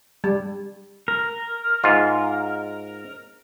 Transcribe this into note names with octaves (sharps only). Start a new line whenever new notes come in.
G3
A#4
G#2 F4